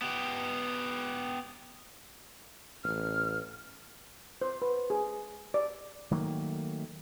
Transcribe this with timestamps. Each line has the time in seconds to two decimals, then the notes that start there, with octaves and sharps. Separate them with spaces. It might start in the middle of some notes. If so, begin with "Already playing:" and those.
0.02 B3 G4
2.84 A1 F6
4.42 C5
4.62 B4
4.90 G#4
5.54 D5
6.11 D#3 F#3 A3 A#3